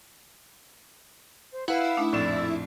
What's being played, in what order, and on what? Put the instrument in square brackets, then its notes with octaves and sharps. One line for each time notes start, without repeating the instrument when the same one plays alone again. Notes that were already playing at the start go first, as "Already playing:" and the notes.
[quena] C5
[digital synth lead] E4 [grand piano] B4 F#5 [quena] F5
[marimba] A3 D4 D#4
[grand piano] A#1 F2 E7 [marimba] A2 [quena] D5